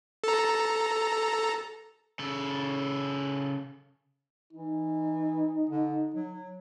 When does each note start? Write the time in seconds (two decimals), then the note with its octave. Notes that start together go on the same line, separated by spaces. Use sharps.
0.24 A4 A#5
2.19 C#3 A4
4.53 E3 D#4
5.70 D3
6.14 F#3